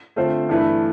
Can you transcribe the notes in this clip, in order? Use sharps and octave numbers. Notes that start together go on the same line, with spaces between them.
D3 A3 C4 F4 C5
G2 E3 A3 E4 B4